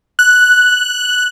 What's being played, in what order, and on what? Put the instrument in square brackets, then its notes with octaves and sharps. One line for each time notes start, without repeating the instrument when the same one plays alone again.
[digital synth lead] F#6